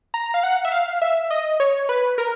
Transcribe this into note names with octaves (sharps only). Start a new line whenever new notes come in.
A#5
F5
F#5
E5
F5
E5
D#5
C#5
B4
A#4